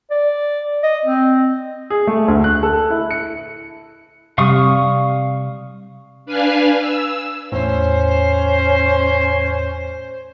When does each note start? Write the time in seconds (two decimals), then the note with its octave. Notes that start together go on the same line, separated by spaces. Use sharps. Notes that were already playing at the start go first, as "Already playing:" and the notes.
0.11 D5
0.83 D#5
1.05 C4
1.90 G#4
2.07 A3
2.28 D2
2.44 F#6
2.63 A4
2.90 E4
3.11 C#7
4.38 C3 G3 F5 C#6 D#6
6.26 D4 B4 F5 G#5 F6
6.79 E6
7.52 E2 A2 C#4 C5